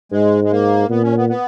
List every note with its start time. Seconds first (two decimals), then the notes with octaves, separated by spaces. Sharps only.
0.12 G#2 G#3
0.44 G#3
0.52 A#3
0.90 A#2 B3
1.03 C#4
1.17 B3
1.29 B3